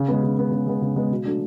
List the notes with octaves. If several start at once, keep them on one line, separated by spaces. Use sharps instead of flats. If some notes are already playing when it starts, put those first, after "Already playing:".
Already playing: C#3
G#3 B3
C#3
G#3 B3
C#3
G#3 B3
C#3
G#3 B3
B2
F#3 A3 D4